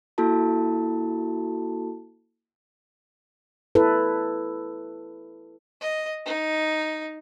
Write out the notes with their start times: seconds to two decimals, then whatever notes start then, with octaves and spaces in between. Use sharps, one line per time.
0.18 A#3 E4 F#4 A4 A5
3.75 E4 A4 B4
5.81 D#5
6.26 D#4